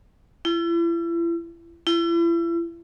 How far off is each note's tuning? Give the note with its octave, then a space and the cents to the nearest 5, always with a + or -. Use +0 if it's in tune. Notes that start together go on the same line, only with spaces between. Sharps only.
E4 +40
E4 +40